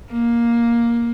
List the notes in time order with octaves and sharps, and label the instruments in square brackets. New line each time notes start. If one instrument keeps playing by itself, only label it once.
[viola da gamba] A#3